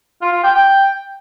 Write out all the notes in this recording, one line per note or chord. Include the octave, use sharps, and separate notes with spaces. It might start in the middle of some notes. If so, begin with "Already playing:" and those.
F4
F4
G5
G5